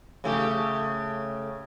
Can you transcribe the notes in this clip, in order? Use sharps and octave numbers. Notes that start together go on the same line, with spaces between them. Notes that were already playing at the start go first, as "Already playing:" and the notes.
C#3 A3 G4